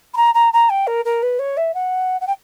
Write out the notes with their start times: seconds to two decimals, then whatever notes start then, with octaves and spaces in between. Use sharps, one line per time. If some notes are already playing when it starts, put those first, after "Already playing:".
0.14 B5
0.17 A#5
0.34 A#5
0.53 A#5
0.69 G5
0.87 A#4
1.05 A#4
1.22 B4
1.39 C#5
1.57 E5
1.74 F#5
2.21 F#5
2.27 G5